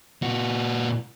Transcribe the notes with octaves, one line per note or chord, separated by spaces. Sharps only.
A#2 F#4